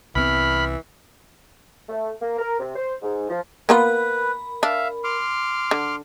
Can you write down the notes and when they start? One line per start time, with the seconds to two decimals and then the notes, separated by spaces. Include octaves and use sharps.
0.15 C2 E3 B3 C4 B5 F6
1.89 A3
2.21 A#3
2.39 A#4
2.60 C3
2.76 C5
3.02 G#2
3.29 F3
3.69 A#3 B3 F4 A#4 B4 B5
4.63 D4 E5 F5
5.04 C6 D6 F6
5.71 D3